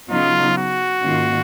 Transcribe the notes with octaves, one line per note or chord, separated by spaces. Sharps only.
C#3 F#3 B3 D#4 F4
F#4
G#2 D#3 A#3 C#4 F4